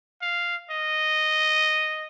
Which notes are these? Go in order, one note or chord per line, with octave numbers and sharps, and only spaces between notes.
F5
D#5